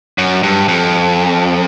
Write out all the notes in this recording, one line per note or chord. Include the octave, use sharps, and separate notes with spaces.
F#2
G2
F2